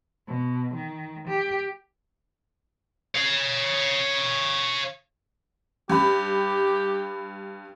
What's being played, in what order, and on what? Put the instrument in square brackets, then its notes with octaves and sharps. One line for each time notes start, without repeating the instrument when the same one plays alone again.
[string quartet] B2
D#3
G4
[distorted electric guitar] C#5 F5
[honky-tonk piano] G2 B5 [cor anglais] G4